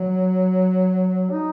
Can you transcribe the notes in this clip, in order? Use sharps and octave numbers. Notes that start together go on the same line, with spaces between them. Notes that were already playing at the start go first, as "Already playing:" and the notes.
Already playing: F#3
D#4